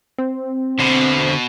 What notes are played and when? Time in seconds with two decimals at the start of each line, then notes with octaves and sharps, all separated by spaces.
0.18 C4
0.79 B2 D3 C5